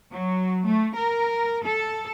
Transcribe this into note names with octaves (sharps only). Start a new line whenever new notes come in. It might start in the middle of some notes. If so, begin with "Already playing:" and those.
F#3
A3
A#4
A4